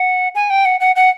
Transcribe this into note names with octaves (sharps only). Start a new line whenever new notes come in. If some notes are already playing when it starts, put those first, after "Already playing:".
Already playing: F#5
G#5
G5
F#5
F#5
F#5